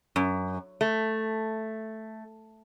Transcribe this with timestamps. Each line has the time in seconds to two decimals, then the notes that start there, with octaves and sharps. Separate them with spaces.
0.16 F#2
0.81 A3